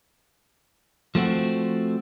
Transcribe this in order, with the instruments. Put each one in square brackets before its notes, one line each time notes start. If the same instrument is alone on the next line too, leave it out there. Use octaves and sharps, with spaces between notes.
[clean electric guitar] F3 A3 C4 F#4